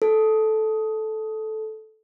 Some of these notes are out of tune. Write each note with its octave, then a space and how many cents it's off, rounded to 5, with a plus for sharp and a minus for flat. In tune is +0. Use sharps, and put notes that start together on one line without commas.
A4 -10